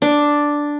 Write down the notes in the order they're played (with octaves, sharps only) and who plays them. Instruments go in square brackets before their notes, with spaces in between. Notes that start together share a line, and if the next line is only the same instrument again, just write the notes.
[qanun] D4